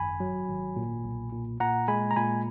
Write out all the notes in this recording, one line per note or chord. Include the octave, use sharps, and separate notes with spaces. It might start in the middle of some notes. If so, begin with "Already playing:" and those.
Already playing: G#1 F#2 G#5 B5
F#3
G#1
A#2
B1
A#2
A#2 F#5 A#5
G#3 G#5 B5
A#5
A#2 G#5 B5